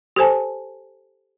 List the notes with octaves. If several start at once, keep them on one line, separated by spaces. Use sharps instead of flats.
G4 A4 C5 G#5 A5